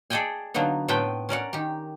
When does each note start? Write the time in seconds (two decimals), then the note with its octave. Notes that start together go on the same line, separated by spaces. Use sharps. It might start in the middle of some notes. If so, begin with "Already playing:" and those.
0.10 G#4 A4 D5 D#5 G5 G#5
0.54 D3 F#3 A#3 B3 D#4
0.88 A2 A3 B3 C4 B4 G5
1.29 C#4 A#4 D5 F#5
1.53 D#3 G4